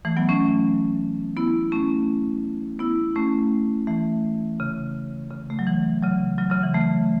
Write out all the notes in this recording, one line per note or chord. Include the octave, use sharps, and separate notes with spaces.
E3 A3
F#3 B3
A3 C#4
B3 E4
A3 C#4
B3 E4
A3 C#4
E3 A3
C#3
C#3
A3
F#3
E3
C#3 F#3
C#3 F#3
C#3 F#3
E3
E3 A3